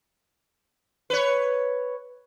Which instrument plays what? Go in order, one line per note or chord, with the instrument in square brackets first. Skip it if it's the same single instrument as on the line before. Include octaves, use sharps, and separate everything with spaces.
[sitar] B4 C#5